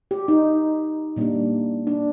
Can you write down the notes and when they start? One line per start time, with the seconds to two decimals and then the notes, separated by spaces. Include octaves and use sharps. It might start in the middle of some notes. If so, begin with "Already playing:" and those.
0.11 G4
0.28 D#4
1.16 A#2 G3 A#3 D4
1.87 D4